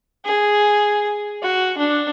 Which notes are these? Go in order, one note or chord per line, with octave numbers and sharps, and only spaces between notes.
G#4
F#4
D4